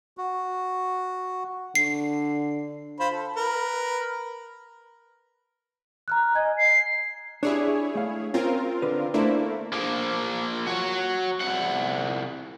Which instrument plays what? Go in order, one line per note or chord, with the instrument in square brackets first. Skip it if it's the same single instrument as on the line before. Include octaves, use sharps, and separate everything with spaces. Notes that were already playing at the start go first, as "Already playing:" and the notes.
[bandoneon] F#4
[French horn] D3 [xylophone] C7
[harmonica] F4 C5 B5
A4
A#4 B4
[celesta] A#5 F6 F#6
[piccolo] D#5 [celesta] G#5 G#6
[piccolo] C7
[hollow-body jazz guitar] D4 G4 [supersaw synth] E4 G#4 C#5
[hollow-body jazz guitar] A3 F5
[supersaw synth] C4 F4 A#4 [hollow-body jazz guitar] C#4
[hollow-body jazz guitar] D3 B4
[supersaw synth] A3 A#3 E4 [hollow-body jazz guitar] D4 C5
[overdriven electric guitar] F3 A#3
F#4 C#5
C2 F#5